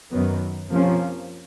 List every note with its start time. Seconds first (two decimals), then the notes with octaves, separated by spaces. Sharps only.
0.11 F#2 D#3 F#3 B3
0.69 C3 F3 A#3 C#4